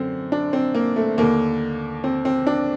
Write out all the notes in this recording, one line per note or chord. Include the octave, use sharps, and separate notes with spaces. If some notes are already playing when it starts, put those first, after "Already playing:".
Already playing: F#2 D3 C4
D4
C4
A#3
A3
D#2 D3 A#3
C4
C4
D4